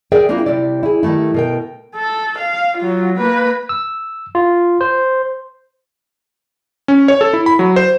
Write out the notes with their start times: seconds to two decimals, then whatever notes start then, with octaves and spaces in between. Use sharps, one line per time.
0.12 G#4 A#4 D5 E5 G5
0.29 A#3 C4 D4 E4 F4
0.46 C3 G3 E4 D5
0.83 E4 G#4
1.03 D#3 G3 A3 E4
1.34 B2 A#4 G5
1.95 A4
2.39 F5
2.78 F#3 F4
3.17 A#3 B4
3.69 E6
4.35 F4
4.81 C5
6.88 C#4
7.08 C#5
7.21 A4
7.33 E4
7.46 B5
7.59 F#3
7.76 C5